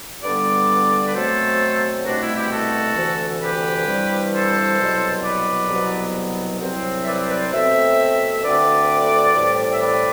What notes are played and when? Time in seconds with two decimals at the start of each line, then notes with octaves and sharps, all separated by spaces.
0.23 G2 D3 G3 B3 B4 D5
1.08 B4
1.13 B2 F#3 A3 C4 A4 C5
2.05 C2 B2 A3 C4 D4 F#4
2.20 E4
2.36 E4 G4
2.51 F#4 A4
2.96 D2 C3 E3
3.41 G4 B4
3.87 G2 E3 G3 C4
4.33 A4 C5
4.79 C2 B2 F#3 B3
5.24 B4 D5
5.69 C2 B2 F#3 B3
6.61 C2 C3 F#3 C4
7.02 E5
7.06 B4 D5
7.30 B4 D5
7.52 B2 A3 C4 C5 E5
8.35 E5
8.43 D2 D3 A3 C4 B4 D5
9.35 A2 E3 G3 C4
9.72 E5
9.81 B4 D5